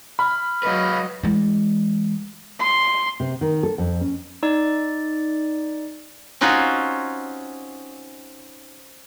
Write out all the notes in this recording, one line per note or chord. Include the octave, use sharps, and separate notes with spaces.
B5 F6
F#3 G#3 B4 D#5
E3 G#3
C6
C3
D#3
A4
F2
C#4
D#4 D5
C4 C#4 D#4 F4 F#4